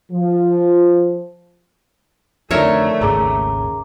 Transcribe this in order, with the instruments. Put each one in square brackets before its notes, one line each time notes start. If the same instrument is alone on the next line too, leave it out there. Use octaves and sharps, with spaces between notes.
[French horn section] F3
[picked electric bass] F2 D3 [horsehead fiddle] A3 [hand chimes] D#4 D5 [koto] A#4 C#5 E5
[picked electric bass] G#1 D#2 C#3 [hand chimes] G#4 A#5 D6